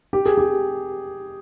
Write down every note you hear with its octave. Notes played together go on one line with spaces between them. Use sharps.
G4
G#4
G4